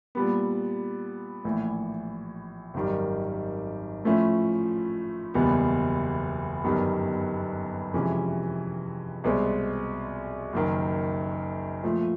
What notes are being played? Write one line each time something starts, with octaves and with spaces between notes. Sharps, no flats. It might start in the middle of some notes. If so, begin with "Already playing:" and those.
A#2 G3 B3
A#1 A2 E3
G#1 F#2 D#3 G3
A2 F3 A3 C#4 E4
F#1 E2 B2 G3 B3
G1 F#2 D#3 G3 B3
F2 C3 E3 G#3 C#4
C2 B2 G#3 C4
F#1 F#2 D#3
A#2 F3 A3